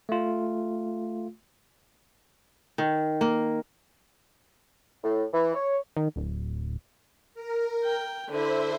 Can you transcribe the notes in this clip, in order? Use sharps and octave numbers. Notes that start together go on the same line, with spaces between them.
A3 F4
D#3
A#3
A2
E3
C#5
D#3
D1
A#4
G5
D3 E4 C5 E5